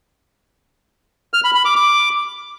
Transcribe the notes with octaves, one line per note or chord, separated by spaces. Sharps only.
F6
B5
B5
D6
D6